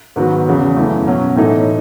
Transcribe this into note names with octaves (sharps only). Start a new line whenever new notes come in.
G#2 D#3 F#3 B3 F#4
E2 C#3 F#3
F#2 E3 A3
B2 F#3 C#4
A2 E3 A3 D#4 A4